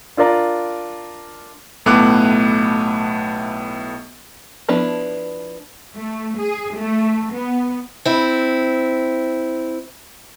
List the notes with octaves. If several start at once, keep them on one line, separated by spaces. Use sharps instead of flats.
D4 F4 A#4 D5 A#5
B1 A2 A3 B3 D6 F#6
F3 B3 D4 E4
A3
G#4
A3
B3
C4 E4